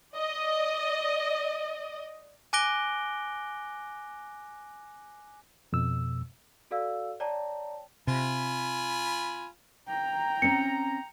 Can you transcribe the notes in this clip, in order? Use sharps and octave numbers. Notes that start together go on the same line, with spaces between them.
D5 D#5
G#5 D6 F#6 A#6 D7 G7
F2 B2 E6
F#4 A4 D5 F5 E6
C#5 D5 G5 A5 A#5
C3 F4 G#5 B5
G5 A#5
C4 C#4 C#7